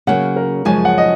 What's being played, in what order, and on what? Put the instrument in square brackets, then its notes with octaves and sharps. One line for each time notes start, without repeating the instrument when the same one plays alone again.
[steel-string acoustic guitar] C#3 F#3 A#3 [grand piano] F#5
[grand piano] A#4
[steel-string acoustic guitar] F#2 C#3 F3 G#3 [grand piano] G#5
[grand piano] F#5
D#5